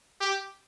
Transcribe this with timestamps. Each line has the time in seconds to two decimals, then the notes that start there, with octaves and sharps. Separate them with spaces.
0.21 G4